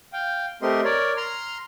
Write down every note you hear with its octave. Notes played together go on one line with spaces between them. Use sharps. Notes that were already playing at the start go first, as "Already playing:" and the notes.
F5 G5
A3 C4 G4 A#4 D#5 C6
A#4 C#5 D5
A#5 C6 F6